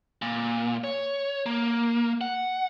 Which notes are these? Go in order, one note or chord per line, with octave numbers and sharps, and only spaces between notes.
A#2
C#5
A#3
F#5